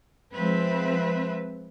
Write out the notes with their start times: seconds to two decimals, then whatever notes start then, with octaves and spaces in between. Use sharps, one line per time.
0.35 F3 G#3 C4 B4 E5